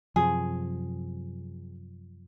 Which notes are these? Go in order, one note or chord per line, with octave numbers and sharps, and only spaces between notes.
F#2 C3 F3 G#4